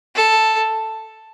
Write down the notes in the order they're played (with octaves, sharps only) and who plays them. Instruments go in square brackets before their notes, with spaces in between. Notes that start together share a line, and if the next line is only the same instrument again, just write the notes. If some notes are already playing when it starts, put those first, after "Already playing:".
[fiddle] A4